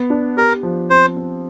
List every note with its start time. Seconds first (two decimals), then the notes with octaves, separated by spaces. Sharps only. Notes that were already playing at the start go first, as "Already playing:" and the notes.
Already playing: B3
0.10 D4
0.37 G4 A#4
0.63 F3
0.90 C4 C5
1.17 C4